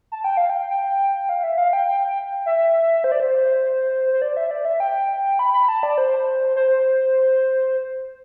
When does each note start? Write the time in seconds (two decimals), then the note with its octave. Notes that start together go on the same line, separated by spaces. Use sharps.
0.12 A5
0.24 G5
0.37 F5
0.50 G5
0.70 G5
1.29 F5
1.43 E5
1.58 F5
1.73 G5
1.87 G5
2.46 E5
3.04 C5
3.12 D5
3.20 C5
4.13 C5
4.22 D5
4.37 E5
4.51 D5
4.65 E5
4.80 G5
5.39 B5
5.54 B5
5.68 A5
5.83 D5
5.98 C5
6.56 C5